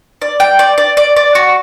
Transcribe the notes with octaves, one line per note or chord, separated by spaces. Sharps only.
D5
G5
D5
D5
D5
D5
F#4